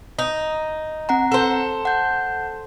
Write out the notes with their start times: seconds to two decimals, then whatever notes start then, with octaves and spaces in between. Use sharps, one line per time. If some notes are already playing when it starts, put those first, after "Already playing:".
0.19 D#4
1.09 C4 F#5 A#5
1.32 A4 C5
1.85 F#5 G6